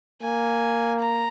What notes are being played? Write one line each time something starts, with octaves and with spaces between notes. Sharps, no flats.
A#3 G#5
A#5